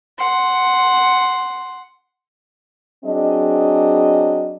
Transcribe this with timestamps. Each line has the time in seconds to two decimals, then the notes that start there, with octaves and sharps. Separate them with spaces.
0.18 F#5 C6
3.05 F#3 C4 D4 G#4 D#5